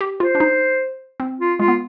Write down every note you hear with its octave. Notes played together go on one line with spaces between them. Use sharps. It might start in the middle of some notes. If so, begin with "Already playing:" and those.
G4
F4 C5
D4
D#4
C4
F4
G#3 F4
B3